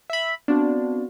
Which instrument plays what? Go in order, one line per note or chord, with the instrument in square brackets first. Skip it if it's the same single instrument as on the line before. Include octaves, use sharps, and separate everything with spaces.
[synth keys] E5 B5
[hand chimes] B3 C4 F#4 [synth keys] D4